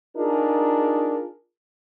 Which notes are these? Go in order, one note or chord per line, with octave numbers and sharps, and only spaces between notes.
D4 D#4 F4 G#4 A#4